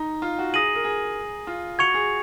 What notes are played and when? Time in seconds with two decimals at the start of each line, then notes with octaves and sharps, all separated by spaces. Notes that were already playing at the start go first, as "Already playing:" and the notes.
Already playing: D#4 A#5
0.22 F4
0.39 F#4
0.53 G#4 D#6 A#6 D#7 F#7
0.75 A#4
0.84 G#4
1.47 F4
1.78 F#4 C#6 G#6 C#7 F7
1.94 G#4